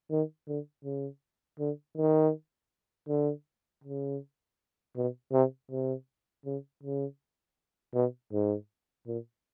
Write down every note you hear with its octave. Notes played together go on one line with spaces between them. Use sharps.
D#3
D3
C#3
D3
D#3
D3
C#3
B2
C3
C3
C#3
C#3
B2
G#2
A#2